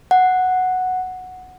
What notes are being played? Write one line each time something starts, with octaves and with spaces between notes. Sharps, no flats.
F#5